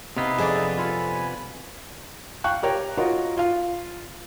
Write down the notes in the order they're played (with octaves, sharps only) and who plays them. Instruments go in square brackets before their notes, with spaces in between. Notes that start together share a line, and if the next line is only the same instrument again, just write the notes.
[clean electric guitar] C3 B3 [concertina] D#4 E4 D#5 [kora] F5
[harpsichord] F2 D4 [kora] G#4 D5
[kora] F4 A4 [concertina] G#5 B5
[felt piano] F5 G5 C#6 F#6
G4 A#4 C#5 G5
F4 F#4 A#4 C#5 D#5
F4 F5